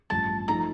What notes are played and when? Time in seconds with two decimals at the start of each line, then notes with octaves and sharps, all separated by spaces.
0.10 A1 G2 F3 A5
0.48 F3 A3 D#4 A#5